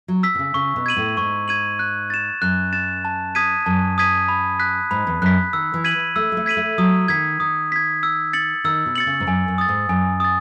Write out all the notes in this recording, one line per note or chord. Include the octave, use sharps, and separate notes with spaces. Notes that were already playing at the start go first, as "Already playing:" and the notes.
F#3
E6 B6
B2
C#3
C#3 C#6
B2
G#6 D#7 F#7
A2
G#2 C#6
G#6 D#7 F#7
F#6
A6 E7
F#2 F#6
A6 E7
A5
D#6 G#6 B6 D#7
F#2 A5
D#6 G#6 B6 D#7
B5
F#6 B6
G#2 B5
E2
F#2 F#6 B6
D#3 E6
E3
G#6 B6 D#7 F#7
A3 E6
G#3
A3
G#6 B6 D#7 F#7
A3
F#3 D#6
D#3 G#6 B6
D#3 D#6
G#6 B6
E6
A6 C#7 F#7
D#3 E6
B2
A6 C#7 F#7
C#3
G#2
F#2 G#5
F#2
D#6 A6
G#2
F#2 G#5
D#6 A6